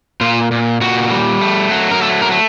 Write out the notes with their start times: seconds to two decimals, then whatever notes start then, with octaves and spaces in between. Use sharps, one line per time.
0.21 A#2 F4
0.52 A#2
0.81 A#2 F#4
1.11 G3
1.41 A3
1.71 F#3
1.91 A#4
2.01 A3 A4
2.22 A#4
2.31 A3